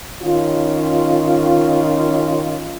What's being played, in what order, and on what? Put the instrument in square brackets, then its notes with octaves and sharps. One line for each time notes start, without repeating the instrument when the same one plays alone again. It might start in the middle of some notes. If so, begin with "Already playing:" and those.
[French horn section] D#3 C#4 F4